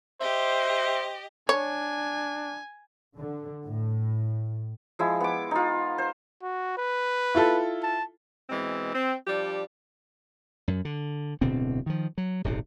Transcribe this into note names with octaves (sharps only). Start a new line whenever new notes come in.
G4 C5 D#5 E5
D4 C#5 G#5
D3
A2
F3 G#3 E4
B3 D6
D#4 F4
C5
F#4
B4
E4 F4 A4
A5
B2 E3 G#3 C4
C4
F3 G3 D4 G4
F#2
D3
D1 B2 D3 C4
D#3 F3
F#3
D#1 G#1 C3